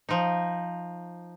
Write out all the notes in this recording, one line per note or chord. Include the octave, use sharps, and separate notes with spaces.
F3 D#4